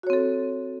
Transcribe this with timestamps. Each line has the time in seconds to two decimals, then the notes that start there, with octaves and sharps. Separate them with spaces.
0.03 F#4
0.07 C#5
0.10 C4
0.13 A4